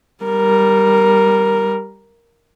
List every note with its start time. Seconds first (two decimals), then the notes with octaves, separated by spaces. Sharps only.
0.23 G3 A#4